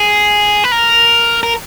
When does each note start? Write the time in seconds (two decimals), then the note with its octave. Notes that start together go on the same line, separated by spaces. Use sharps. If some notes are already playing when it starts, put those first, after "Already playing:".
Already playing: G#4
0.64 B4
0.72 A#4
1.43 A#4